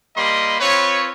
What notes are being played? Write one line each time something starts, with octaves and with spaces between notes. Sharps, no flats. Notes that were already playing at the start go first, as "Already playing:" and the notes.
G3 A#3 D#5 B5 C6
C4 F4 B4 C#5